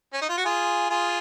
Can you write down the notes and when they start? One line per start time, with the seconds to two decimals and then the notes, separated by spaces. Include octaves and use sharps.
0.13 C#4
0.22 D#4
0.29 F4
0.37 F#4
0.45 F4 G#4
0.90 F4 G#4